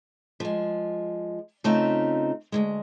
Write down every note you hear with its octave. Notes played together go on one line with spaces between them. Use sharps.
F3 G#3
C#3 A3 C4 D#4 F4 E5
D2 G#2 G#3